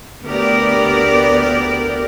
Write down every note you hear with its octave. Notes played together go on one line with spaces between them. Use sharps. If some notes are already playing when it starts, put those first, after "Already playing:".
D2 B3 G4 A#4 D5